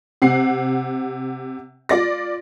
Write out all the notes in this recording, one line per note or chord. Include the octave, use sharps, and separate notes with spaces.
C3 F#5 C7
F4 D5 A#6